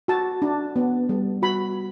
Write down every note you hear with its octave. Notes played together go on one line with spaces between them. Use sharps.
F#4 A5
D4
B3
G3
F#4 B5